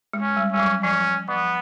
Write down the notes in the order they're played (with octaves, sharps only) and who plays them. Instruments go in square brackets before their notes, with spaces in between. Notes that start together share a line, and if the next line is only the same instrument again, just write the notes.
[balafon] G#3
[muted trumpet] C#4
[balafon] G3
[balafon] G3 [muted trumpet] C#4
[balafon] F#3
[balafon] F3 [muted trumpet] C#4
[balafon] F3 [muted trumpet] B3